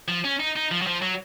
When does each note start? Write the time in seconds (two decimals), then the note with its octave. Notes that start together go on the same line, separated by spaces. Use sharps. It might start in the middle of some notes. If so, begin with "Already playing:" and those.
0.08 F3
0.24 C#4
0.40 D#4
0.56 D#4
0.71 F3
0.81 F#3
0.86 F3
1.02 F#3